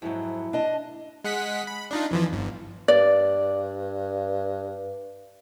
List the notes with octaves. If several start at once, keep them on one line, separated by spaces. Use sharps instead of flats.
F2 G#2 F#3 E4
D4 D#5 A5
G#3 F#5 B6
B5
D4 D#4 F4
F2 E3 F3
G1
G2 D5